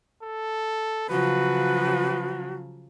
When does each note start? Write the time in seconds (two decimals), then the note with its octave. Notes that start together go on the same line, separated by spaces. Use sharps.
0.23 A4
1.09 C#3 F3 F#3 F#4 B4